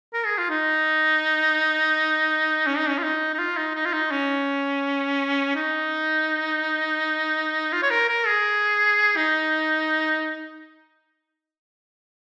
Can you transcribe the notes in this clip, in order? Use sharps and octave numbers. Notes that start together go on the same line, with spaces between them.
A#4
G#4
F4
D#4
C#4
D#4
C#4
F4
D#4
D#4
F4
D#4
D#4
F4
D#4
C#4
D#4
F4
C#5
A#4
A#4
G#4
D#4